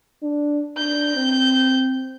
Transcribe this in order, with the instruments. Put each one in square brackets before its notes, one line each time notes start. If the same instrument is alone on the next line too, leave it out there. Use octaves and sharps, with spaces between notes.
[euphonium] D4
[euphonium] D4 [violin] G6
[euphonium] C4